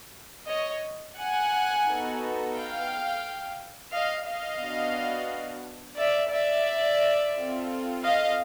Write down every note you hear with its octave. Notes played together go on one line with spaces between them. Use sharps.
C#5 D#5
F#5 G#5
B3 D#4 F#4 A4
F5 G5
D#5 F5
D#5 F5
B3 D4 F#4
D5 E5
D5 E5
C4 F4 A4
D#5 F5